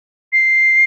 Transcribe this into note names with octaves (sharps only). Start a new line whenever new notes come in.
C7